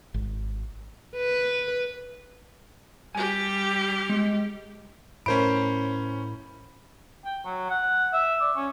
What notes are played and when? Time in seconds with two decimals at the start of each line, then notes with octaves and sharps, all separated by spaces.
0.14 G#1
1.16 B4
3.15 G3 G4 G#5
4.09 G#3
5.26 A2 C#4 A#4 C5 B5 D7
7.25 G5
7.45 F#3
7.70 F#5
8.13 E5
8.41 D5
8.56 C#4